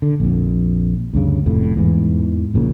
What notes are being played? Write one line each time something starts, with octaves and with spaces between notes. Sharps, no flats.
D3
A#1 F2
D2 G2 C#3
F1 F2 A2
E2 G#2 E3
A#1 A#2 C#3